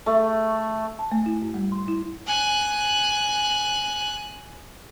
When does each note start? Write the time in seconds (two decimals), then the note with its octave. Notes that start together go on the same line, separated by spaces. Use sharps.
0.06 A3
0.99 A5
1.12 A3
1.26 E4
1.42 G#2
1.54 G3
1.72 C6
1.88 E4
2.27 G#5 F#6